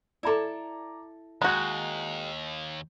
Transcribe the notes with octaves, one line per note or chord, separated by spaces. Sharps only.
E4 A4 D5 A#5 D6
D#2 G#3 F#4 A#5 G6